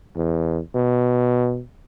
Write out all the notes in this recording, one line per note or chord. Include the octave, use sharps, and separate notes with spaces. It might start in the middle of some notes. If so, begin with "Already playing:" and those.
E2
B2